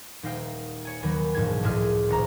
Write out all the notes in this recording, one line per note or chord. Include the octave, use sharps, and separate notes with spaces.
D#1 D#4 F5 G5
C#5 G#5
D#2 D#3 F#3 G#5 B5
E1 A#1 G#2 G#6
F#1 C#2 A2 G#4 F6
D#1 C2 A#5